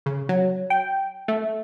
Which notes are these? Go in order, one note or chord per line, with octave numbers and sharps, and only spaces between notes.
C#3
F#3
G5
A3